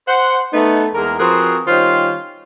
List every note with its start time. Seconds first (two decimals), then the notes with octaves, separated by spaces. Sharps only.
0.08 C5 F#5
0.53 A3 B3 D#4
0.95 E2 G#3 A#3 A#4
1.19 F3 C4 F#4 G#4 A#4 B4
1.67 D#3 G3 C#4 F4 C5